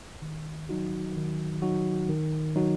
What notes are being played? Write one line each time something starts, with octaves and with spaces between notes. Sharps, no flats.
D#3
F#3 D#4 F#4
D#3
F#3 D#4 F#4
D#3
F#3 D#4 F#4